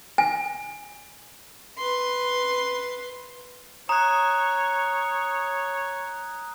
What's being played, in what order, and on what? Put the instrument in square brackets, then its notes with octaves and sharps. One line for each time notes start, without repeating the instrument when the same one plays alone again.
[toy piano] G#5
[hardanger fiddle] B4 C6
[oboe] C#5 [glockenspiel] A#5 [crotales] D#6 F#6